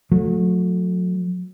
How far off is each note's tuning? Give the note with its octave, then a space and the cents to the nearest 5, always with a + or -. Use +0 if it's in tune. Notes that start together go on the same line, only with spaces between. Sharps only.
F#3 -35 A3 +0